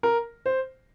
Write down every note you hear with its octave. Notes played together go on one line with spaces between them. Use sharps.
A#4
C5